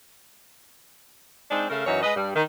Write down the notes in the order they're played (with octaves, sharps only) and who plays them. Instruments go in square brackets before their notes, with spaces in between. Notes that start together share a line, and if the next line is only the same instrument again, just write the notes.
[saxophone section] G#3 C4 D4 D#4
C#3 A3 A#4 E5 F5
F#2 E3 D#4 F#4 C#5
G#3 B4 D#5
G2 G3
D#3